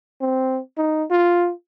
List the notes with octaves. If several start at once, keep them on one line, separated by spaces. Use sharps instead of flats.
C4
D#4
F4